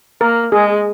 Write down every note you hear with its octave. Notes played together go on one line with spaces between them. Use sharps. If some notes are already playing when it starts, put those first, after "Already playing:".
A#3 A#4
G#3 G#4